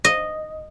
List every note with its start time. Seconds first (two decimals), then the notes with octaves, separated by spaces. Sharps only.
0.05 D#5